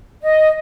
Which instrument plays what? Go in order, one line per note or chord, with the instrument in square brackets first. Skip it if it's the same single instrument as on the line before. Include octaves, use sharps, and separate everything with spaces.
[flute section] D#5